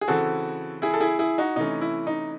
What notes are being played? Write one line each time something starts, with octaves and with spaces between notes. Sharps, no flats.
G#4
C#3 E3 C4 F#4 A4
E4 G#4
A4
E4 G#4
E4 G#4
D#4 F#4
C3 E3 A3 C#4 D#4
E4
D#4